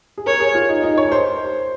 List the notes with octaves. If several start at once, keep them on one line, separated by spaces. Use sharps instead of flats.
G#4
A#4 C#5
G#4
F4
D#4
D#4
C#5
C5